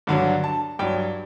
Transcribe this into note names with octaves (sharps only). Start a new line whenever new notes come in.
G2 D3 F#3
A5
G2 F#3 G5